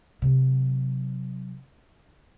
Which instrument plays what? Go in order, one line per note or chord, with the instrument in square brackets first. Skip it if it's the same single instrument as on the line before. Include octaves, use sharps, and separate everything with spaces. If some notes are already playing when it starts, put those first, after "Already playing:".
[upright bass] C3 F#3